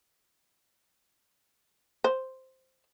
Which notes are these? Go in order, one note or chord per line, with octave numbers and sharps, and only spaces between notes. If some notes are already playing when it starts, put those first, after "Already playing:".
C5